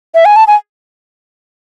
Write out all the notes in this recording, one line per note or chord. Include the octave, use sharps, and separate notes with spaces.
E5
G#5
A5
G#5